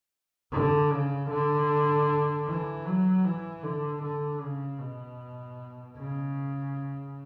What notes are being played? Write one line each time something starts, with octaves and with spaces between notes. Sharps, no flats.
D3
C#3
D3
E3
F#3
E3
D3
D3
C#3
B2
C#3